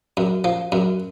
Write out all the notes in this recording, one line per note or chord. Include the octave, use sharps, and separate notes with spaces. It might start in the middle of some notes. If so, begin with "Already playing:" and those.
F#2
F3
F#2